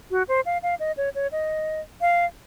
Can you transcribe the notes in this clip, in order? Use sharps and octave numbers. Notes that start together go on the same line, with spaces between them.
F#4
C5
F5
F5
D#5
C#5
C#5
D#5
F5